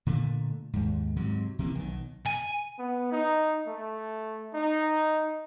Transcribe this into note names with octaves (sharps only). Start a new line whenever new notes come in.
A#2 D3 A3
D#2 G#2
G#2 C3 F#3
C3 E3 G3 A#3
B1 D#3
G#5
B3
D#4
A3
D#4